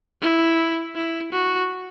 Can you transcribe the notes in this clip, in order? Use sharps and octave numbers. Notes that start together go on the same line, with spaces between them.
E4
E4
F#4